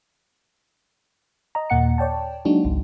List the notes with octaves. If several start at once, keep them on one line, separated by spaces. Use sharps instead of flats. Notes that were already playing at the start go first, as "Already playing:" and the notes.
D#5 A#5
D#2 A#2 A#3 F#5 C#7
C#5 D5 G5 A5
F#3 G#3 A#3 D4 D#4 F#4
G#1 C#2